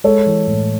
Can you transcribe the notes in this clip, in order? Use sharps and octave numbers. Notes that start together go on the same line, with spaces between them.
G#3 A4 C#5
E3
A2